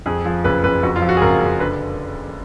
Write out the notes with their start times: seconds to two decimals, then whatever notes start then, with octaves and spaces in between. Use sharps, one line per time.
0.06 F2 G#4
0.25 F3
0.44 F#1 B4
0.63 F#1 B4
0.83 F2 F#4
0.96 F4
1.02 F3
1.09 F#4
1.17 G#4
1.21 F#1 A#4
1.41 F#1
1.60 D3 B4